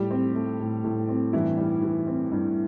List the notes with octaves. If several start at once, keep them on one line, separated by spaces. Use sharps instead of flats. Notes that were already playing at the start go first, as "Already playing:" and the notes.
Already playing: A2 G3 G4
C4
A3
A2
A2
C4
G2 E3 E4
G3
E3
C4
G2